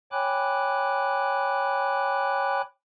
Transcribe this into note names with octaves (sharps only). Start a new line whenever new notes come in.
C#5 G5 G#5 B5 D6 F#6